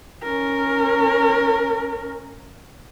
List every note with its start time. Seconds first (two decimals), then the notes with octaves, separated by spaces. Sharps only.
0.23 C#4 A#4